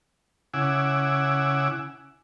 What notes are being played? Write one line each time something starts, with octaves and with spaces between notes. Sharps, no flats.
C#3 E4 F#5 G#5 D6 E6